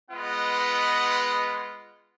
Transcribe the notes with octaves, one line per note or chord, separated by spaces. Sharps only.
G#3 B3 F4 B4 D#5 F#5